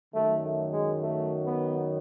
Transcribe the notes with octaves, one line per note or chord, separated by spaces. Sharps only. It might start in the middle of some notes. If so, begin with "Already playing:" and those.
F#2 D#3 F#3 A3
A3
G#3
A3
B3